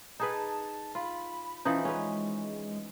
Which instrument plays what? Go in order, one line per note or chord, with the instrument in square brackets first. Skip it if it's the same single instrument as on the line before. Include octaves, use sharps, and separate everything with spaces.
[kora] D#4 G#4 B4 [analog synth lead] A5
[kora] F4 [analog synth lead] B5
[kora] E3 F3 D#4 [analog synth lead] C#4
[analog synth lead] G#3 [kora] C#4 B4